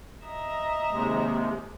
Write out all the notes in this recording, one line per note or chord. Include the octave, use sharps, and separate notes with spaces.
D#5 E5 A#5
D#2 C3 G#3